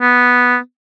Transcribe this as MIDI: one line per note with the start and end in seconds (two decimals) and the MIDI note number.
0.02 0.58 59